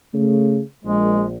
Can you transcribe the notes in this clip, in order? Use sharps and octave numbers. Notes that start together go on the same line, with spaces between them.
C#3 A3
A#1 G#3